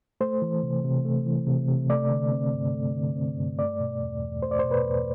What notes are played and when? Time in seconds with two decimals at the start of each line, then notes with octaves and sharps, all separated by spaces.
0.21 A3 C5
0.42 E3
0.63 C3
0.84 C3
1.05 A3
1.26 E3
1.47 C3
1.68 C3
1.90 A3 D5
2.11 D3
2.32 C4
2.53 G2
2.74 A3
2.95 D3
3.16 C4
3.37 G2
3.58 A3 D5
3.80 B2
4.01 E2
4.22 E2
4.42 A3 C5
4.51 D5
4.59 B2 C5
4.71 B4
4.85 E2